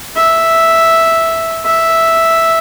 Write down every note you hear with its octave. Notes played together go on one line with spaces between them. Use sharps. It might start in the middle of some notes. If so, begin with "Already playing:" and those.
E5
E5